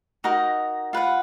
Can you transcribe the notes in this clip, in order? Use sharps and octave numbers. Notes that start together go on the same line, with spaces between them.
D#4 F#4 A#4 D#5
F4 B4 F#5